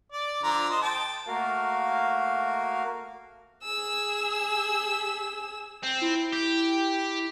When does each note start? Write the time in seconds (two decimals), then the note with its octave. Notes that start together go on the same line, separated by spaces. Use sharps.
0.12 D5
0.43 D3 F3 A#5
0.70 C5 D#5
0.82 G5 A5
1.27 A3 A#3 F#4 A#4 F5
3.64 G#4 E6
5.83 C4
6.01 E4
6.33 G4